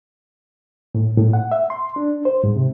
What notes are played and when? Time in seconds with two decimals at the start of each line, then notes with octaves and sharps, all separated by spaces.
0.95 A2
1.18 A2
1.33 F#5
1.52 E5
1.70 C6
1.96 D4
2.25 C5
2.44 G#2
2.56 C3